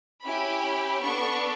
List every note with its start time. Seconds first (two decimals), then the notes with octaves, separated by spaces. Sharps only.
0.23 C#4 E4 G4 B5
1.00 B3 D4 A4 C#6